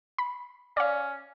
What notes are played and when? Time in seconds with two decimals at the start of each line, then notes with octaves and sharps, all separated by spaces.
0.18 B5
0.77 C#4 D5 F5